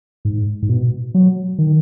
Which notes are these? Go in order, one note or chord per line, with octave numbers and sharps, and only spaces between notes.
G#2
G#2
B2
F#3
D#3